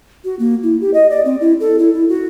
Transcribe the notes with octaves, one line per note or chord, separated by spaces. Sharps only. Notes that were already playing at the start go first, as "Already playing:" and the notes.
F#4
A#3
E4
G4
D#5
D5
C4
E4
A4
E4
E4
F#4